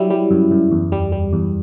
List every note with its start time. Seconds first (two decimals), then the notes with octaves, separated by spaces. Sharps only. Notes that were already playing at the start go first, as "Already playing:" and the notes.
Already playing: F#3 G3 E4
0.10 G3
0.31 F#2
0.51 F#2
0.72 E2
0.92 G3
1.12 G3
1.33 E2